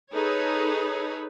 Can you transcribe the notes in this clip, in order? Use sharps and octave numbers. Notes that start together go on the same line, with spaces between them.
D#4 G#4 A4 B4 C#5